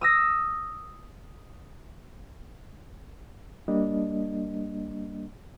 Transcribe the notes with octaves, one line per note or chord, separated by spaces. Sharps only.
D#6 E6 A#6
G3 A#3 D4 D#5